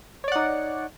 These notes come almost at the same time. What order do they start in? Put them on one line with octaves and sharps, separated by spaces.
C#5 D5 F#5 D#4